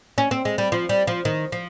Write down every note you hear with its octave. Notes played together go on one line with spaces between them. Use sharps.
C#4
C4
G#3
G3
F3
G3
F3
D#3
F3